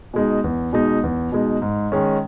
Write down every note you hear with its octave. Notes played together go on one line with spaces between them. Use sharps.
B2 G#3 D#4
E2
B2 G#3 D#4
E2
B2 G#3 D#4
G#2
D#3 G#3 C#4